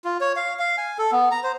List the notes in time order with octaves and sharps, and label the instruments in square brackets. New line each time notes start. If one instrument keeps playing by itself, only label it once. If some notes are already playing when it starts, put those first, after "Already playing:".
[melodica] F4
C#5
F5
F5
G#5
A4
B3
A#5
C5